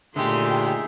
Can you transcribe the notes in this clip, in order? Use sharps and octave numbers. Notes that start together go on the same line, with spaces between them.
A#2 D3 A3 D#4 G4 G#4 E5 C6